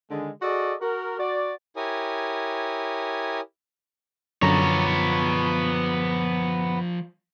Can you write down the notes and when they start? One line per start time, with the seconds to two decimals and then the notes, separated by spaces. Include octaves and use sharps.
0.11 D3 D#3 G#3
0.42 F#4 G#4 A4 D5 D#5
0.81 F#4 A#4
1.18 F#4 D5
1.76 E4 G4 A#4 C#5 G#5 D#6
4.42 F#2 D3 F3 B3 C#5 D5 A#5